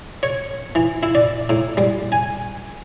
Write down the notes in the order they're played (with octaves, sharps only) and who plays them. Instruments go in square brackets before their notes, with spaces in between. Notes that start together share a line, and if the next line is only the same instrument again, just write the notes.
[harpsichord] C#5
E3
E4
D5
A2
G3
G#5